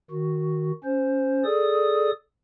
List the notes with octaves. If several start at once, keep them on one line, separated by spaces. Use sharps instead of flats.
D#3 F#4
C#4 C5
G#4 A4 D5 D#6